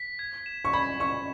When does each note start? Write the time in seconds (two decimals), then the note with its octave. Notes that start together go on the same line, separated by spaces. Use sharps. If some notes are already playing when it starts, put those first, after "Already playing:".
Already playing: B6
0.19 G#6
0.46 E7
0.65 C#6
0.73 B5 G#6
1.00 C#6 E7